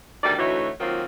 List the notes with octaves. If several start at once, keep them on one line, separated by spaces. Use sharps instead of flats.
D2 D#3 G3 D5
D2 E3 A3 D#4 F#4 C#5
D#3 F#3 A#3 C4 F4